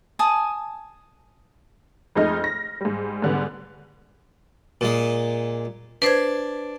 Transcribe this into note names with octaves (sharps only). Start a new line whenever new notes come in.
G#5 A5 D#6
F2 G#3 A3 D#4 D#5 F6
A#6
G#2 G3
G#2 D3 G3 B3
A#2 G#3
D4 B4 C5 G#6